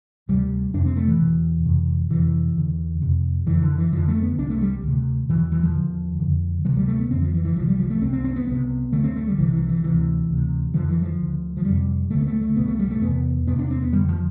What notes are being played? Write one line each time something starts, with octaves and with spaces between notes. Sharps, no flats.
D2 C3 G3
F2 C3 D4
C4
A3
E3
E2 B2
F2 C3
F2 C3 E3
E2 D3
F2 C3
F2 D3 E3
D3
E3
F2 D3 F3
A3
B3
C2 C3 D4
A3
G3
D2 C3
E2 B2 E3
E3
F3
E2 D3
F2 D3
D2 C3 F3
G3
A3
B3
F2 D3 C4
F3
E3
E3
C2 C3 F3
G3
F3
A3
C2 C3 C4
C4
C4
B3
C2 C3 B3
D2 D3 A3
C4
A3
G3
C2 C3 E3
E3
E3
D2 C3 E3
D2 C3
F2 D3 F3
E3
F3
D2 D3
F3
F2 C3 G3
D2 D3 A3
B3
A3
A3
C2 B2 B3
A3
G3
A3
E2 C3 B3
E2 C3 B3
D4
C4
B3
F2 D3 G3
F3